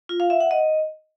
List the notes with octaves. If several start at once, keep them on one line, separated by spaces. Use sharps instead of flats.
F4
F5
E5
F#5
D#5